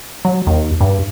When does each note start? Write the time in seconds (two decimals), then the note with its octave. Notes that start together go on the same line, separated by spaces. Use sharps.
0.25 F#3
0.47 D#2
0.80 G2